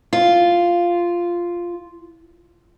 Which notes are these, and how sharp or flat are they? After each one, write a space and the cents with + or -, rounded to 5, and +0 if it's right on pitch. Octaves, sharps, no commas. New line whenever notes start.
F4 -5